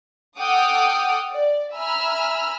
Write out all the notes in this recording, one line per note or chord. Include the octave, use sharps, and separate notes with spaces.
A4 F#5 G5 D6 D#6 F6
D5
E5 G#5 A#5 B5 E6 F6